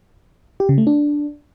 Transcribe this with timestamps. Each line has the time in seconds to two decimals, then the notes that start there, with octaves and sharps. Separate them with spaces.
0.60 G4
0.69 C#3
0.78 A3
0.87 D4